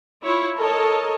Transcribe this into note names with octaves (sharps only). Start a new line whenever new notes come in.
E4 F4 C#5
A4 A#4 C#5 D#5 A5